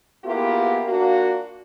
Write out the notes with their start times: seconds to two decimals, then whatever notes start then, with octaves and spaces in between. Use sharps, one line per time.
0.23 A#3 B3 E4 F4 G4 G#4
0.85 A#3 D4 F4 F#4